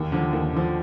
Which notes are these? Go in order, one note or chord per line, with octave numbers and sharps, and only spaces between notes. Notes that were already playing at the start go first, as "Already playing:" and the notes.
Already playing: D#2
D3 F3
D#2
D3 F3